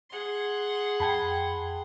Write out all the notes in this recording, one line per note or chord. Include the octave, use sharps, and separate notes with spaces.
G#4 F#5 C6
F2 G5 A5 B5 G#6